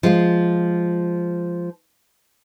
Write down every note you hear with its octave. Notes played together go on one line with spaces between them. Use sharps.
F3 G#3 F4